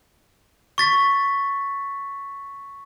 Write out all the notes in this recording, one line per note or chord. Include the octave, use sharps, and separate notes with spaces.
C#6 A6 B6